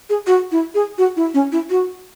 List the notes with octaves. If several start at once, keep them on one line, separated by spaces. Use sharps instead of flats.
G#4
F#4
E4
G#4
F#4
E4
C#4
E4
F#4